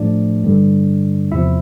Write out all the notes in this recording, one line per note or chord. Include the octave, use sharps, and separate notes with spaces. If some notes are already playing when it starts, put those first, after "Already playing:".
Already playing: A2 F3 A3 D4 D5
G2 D3 G3
E2 C3 F3 E4 E5